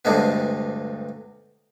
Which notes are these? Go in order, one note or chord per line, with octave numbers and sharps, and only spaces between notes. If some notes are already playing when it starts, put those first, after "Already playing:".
D2 G2 C3 G#3 B3